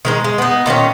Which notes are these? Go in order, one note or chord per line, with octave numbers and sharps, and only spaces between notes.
D#3 G#3 D#4
G#3
B3 D#4
A#2 D#3 C4 C#4